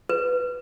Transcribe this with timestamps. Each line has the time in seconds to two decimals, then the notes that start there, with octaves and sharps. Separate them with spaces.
0.09 B4